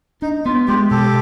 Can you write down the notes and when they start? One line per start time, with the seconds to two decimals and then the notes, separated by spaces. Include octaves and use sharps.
0.22 D4 D#4
0.45 B3 F4
0.68 G#3 F4 G4
0.91 B2 G4 A4